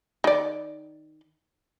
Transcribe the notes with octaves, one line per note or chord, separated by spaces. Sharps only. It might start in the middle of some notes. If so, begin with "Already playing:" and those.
D#3 D5